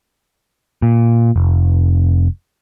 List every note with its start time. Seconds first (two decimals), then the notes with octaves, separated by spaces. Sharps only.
0.82 A#2
1.36 F1